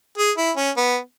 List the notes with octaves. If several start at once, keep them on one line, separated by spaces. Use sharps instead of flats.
G#4
E4
C#4
B3